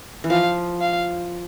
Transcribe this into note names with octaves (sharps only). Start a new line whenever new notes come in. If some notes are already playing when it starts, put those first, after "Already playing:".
E3
F3 F5
F5